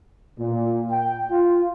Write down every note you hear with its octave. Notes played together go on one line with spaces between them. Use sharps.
A#2
G5
F4